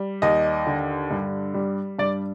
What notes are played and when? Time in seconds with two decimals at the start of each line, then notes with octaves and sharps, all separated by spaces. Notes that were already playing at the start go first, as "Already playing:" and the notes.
Already playing: G3
0.22 D#2 D#5
0.67 D3
1.11 G2
1.54 G3
1.99 G2 D5